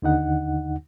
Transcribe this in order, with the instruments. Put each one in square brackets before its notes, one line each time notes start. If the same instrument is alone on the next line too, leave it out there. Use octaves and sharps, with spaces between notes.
[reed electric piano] D#2 D3 D#4 F#5